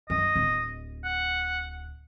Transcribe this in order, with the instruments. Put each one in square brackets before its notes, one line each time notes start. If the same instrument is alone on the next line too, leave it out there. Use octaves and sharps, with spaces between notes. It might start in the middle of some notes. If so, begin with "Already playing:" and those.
[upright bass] F#2 [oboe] D#5
[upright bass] D1
[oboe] F#5